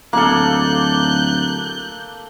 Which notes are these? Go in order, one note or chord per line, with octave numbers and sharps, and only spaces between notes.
D1 A#3 A4 F#6 G6